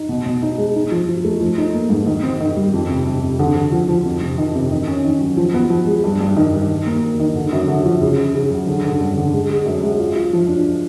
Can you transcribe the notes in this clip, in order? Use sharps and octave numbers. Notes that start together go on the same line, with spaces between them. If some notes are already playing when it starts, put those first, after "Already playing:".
Already playing: D#4
B2
B2
D#4
G#3
D#4
F3
F3
A3
F3
D#4
A#3
G#2
D#3
C4
D#3
G3
F2
C3
C3
C3
D3
D3
F3
F3
F2
C3
D#3
C3
D#3
C#4
D#3
F#3
F3
B3
F3
G#3
G2
G2
D#3
G2
D#3
A#3
A#3
D#3
D3
F#2
D3
F3
C#3
C#3
C#3
F#3
D3
D3
G2
D3
G#3
G#3
F#2
G#3
F4
F4
F3
D4